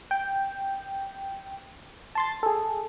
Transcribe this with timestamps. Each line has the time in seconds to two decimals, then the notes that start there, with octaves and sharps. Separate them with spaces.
0.11 G5
2.15 A5 C6 A6
2.43 G#4 A4